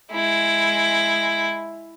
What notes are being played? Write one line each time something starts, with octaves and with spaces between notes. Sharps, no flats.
G#3 E4